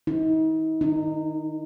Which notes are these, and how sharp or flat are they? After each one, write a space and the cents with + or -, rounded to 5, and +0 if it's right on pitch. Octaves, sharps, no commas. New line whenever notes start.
D#4 +40
D#4 -20